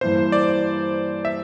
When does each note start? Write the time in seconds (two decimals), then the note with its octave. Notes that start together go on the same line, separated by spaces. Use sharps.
0.01 G2 E3 A#3 E4 C5
0.32 D5
1.25 E5